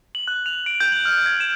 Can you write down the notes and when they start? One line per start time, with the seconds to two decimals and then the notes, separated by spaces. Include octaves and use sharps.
0.15 F#7
0.28 F#6
0.46 F7
0.66 D7
0.80 G6
0.92 F#7
1.05 F6
1.26 G#6
1.40 E7